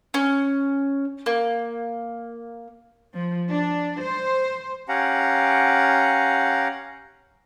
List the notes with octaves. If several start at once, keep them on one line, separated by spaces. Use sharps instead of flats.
C#4
A#3
F3
D4
C5
C#4 G4 F5 F#5 A#5